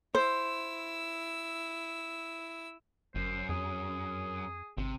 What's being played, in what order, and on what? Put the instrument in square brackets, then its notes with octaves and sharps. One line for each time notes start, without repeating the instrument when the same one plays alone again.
[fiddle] E4 E6 [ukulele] C5
[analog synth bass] G1 [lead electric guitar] F#2 [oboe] C5
[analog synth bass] F2 [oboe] G#4
[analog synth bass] G#1 [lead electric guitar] C3